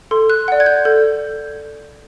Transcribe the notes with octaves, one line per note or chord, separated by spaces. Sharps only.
A4 C6
F#6
D5 F#5
G#6
G6
A4 G6